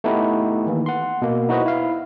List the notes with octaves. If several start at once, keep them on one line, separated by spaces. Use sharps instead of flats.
A3 B3 D#4 E4 G4 B4
D#3 E3 A#3
F#5 C6
B2 A#3
D#4 E4 F#4 B4 C5 D#5
E4 F5